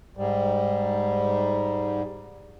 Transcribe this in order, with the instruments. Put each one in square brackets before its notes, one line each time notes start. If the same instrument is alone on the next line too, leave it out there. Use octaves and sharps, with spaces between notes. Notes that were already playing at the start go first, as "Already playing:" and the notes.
[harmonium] G#2 G3